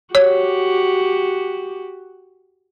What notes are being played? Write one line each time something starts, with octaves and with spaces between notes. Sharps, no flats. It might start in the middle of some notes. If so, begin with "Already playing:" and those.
F#4 G4 C#5